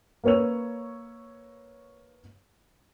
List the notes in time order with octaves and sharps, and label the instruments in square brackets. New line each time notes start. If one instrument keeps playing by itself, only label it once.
[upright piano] A#3 B4 C#5 E6 F7